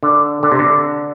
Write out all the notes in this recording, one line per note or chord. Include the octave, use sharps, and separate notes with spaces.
D3
D3
C3
D3